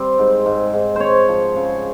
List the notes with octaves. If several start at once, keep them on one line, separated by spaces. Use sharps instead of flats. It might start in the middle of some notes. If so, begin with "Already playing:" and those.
Already playing: G3 C4
G#2
G#2
G#2
C4 C5 C#5
F3
C#3